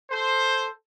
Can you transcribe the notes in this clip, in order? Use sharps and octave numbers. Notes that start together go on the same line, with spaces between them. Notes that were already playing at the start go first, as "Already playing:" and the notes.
A4 C5